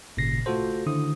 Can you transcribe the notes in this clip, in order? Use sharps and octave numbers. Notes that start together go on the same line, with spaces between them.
G#1 A#2 C#3 A#6 C7
A3 F4 F#4 A4 C5
D3 D#3 E4 D#6